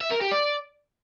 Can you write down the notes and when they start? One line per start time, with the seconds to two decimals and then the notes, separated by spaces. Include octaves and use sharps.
0.01 E5
0.11 A#4
0.21 G4
0.32 D5